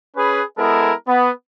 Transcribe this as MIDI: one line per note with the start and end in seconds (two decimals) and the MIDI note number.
0.16 0.42 61
0.16 0.42 68
0.16 0.42 71
0.58 0.92 56
0.58 0.92 59
0.58 0.92 64
0.58 0.92 69
0.58 0.92 70
1.07 1.30 59